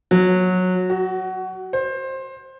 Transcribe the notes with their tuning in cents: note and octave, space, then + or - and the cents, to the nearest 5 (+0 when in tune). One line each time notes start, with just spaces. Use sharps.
F#3 -15
F#4 +20
C5 +20